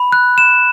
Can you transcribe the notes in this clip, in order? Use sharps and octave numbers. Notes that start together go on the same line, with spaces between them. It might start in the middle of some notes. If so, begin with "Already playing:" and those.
Already playing: B5
F#6
E7